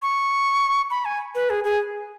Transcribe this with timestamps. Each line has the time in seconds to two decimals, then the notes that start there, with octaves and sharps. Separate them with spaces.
0.02 C#6
0.90 B5
1.05 G#5
1.35 B4
1.50 G#4
1.64 G#4